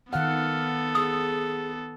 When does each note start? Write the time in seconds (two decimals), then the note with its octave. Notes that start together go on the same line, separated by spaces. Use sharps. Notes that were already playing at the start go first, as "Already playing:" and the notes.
0.13 D#3 B3 A4 F5 F#5 F6
0.95 G#4 D#6 E6